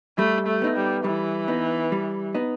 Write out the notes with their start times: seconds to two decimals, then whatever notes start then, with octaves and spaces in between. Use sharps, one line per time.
0.18 G3 A3
0.47 A3
0.62 B3 D#4
0.77 G3
1.04 E3 G3
1.48 B3 D#4
1.92 G3
2.35 B3 D#4